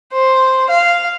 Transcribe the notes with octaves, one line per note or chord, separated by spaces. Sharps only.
C5
F5